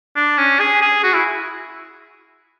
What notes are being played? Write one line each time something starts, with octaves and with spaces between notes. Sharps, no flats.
D4
C#4
G#4
G#4
F#4
E4